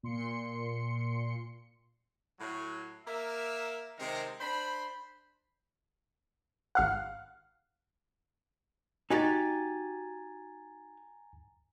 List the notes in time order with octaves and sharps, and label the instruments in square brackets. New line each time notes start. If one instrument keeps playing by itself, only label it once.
[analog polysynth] A#2 C6 C#7
[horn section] A2 F#3
A#3 A#4 E5
C3 D#3 G#3 C4 A#4
D4 C5 B5
[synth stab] G#1 F5 F#5
[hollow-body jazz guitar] D#4 F#4 G4 [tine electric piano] G#5 A#5 A6